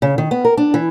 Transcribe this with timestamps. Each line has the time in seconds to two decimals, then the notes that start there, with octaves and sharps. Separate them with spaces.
0.02 C#3
0.18 D#3
0.31 B3
0.45 A#4
0.57 D4
0.74 E3